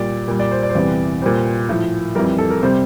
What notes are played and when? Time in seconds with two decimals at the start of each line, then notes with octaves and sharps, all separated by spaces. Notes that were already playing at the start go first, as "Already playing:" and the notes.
Already playing: A#2 G3 D5
0.28 A#2 G3
0.40 D5
0.51 C5
0.63 D5
0.69 C5
0.75 E2 C3 E3 G3 D5
1.22 A#2 G3 C5
1.69 A2 F3
2.15 F2 E3 G3 A#4
2.38 A4
2.50 A#4
2.62 C3 G3 C5